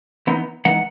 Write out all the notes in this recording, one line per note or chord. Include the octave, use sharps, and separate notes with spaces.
E3 B3 D#4
E3 G#3 D#4 F#5